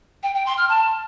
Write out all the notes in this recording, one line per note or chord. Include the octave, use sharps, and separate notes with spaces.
G5
G5
C6
F6
A5